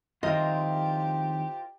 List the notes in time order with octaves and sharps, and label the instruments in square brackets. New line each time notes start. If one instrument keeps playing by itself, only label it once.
[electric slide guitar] F2 D#3 E5 [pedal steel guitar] F4 A#4 C5 [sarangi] G4 [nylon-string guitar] D#5